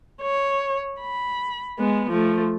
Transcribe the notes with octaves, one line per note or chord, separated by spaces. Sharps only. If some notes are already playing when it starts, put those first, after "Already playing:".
C#5
B5
G#3 B3
F3 A3